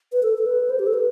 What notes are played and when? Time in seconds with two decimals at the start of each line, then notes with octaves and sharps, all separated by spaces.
0.12 B4
0.23 A4
0.38 A4
0.46 B4
0.70 C5
0.79 G4
0.87 A4
0.93 B4